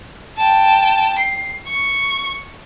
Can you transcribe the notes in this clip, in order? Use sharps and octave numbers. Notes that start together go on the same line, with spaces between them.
G5 A5
C7
C#6